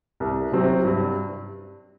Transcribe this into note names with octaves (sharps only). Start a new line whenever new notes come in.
C2
C3 F#3 C4
G2